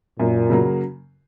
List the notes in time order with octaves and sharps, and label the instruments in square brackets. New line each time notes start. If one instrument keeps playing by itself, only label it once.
[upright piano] F#2 [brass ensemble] A#2
[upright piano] C#3 F#3 A#3